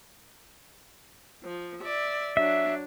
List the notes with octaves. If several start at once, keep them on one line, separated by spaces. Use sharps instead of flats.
F3
D5 E5
F#3 D4 E5